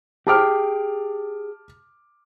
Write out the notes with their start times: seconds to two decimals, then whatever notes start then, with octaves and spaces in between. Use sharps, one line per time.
0.27 G4 G#4 G5 A5 D6 F6